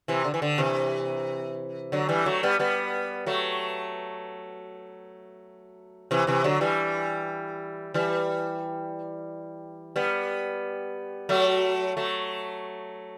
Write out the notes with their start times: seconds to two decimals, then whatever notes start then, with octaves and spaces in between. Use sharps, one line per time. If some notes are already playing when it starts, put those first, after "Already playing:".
0.08 C3 E3
0.25 D3
0.34 E3
0.42 D3
0.58 C3 E3
1.92 D3 F#3
2.09 E3 G3
2.26 F#3 A3
2.43 G3 B3
2.59 G3 B3
3.26 F#3 A3
6.11 C3 E3
6.27 C3 E3
6.44 D3 F#3
6.61 E3 G3
7.94 E3 G3
9.96 G3 B3
11.29 F#3 A3
11.97 F#3 A3